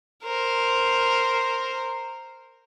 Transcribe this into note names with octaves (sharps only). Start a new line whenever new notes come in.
A#4 C5